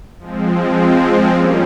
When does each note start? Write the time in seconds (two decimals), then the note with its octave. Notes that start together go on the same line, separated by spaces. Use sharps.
0.19 F3 G#3 C4
1.32 G3 A#3 C#4 F4